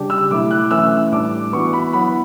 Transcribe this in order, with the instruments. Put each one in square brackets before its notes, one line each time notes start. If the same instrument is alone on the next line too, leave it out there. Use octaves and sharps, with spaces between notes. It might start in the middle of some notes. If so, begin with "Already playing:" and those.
Already playing: [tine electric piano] C#3 G3 D4 G4
[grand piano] E6
[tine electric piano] B2 F#3 A3 E4 [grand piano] D6
[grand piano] F#6
[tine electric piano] E3 A3 C#4 E4 [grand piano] E6
[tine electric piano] A2 G3 D4 [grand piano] D6
[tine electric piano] E3 B3 F#4 [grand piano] C#6
[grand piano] B5
[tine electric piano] F#3 B3 E4 [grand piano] B5